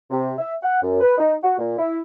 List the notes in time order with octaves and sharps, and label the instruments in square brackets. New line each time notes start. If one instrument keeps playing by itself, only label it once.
[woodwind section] C3
E5
F#5
F#2
B4
D#4
F#4
A#2
E4